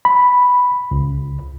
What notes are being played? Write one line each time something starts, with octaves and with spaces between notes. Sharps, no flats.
B5
C#2